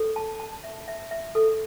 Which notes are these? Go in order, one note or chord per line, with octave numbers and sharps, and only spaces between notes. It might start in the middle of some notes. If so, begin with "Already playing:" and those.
Already playing: A4
A5
A5
E5
E5
E5
A4